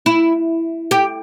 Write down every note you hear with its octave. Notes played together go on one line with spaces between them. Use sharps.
E4
G4